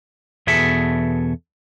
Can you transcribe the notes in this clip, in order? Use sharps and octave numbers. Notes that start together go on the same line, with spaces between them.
E2 B2 G#4 A4 E5 A5